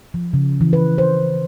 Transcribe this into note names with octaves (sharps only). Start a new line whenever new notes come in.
F3
C#3
E3
B4
C5